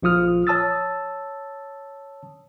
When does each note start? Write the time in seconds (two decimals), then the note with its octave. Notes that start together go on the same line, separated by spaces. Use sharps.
0.02 A#1 F3 F4 D#6 F6
0.47 C#5 A5 D#6 E6 A6